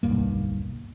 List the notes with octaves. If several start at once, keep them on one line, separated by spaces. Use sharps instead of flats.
D1 B1 G2 A#3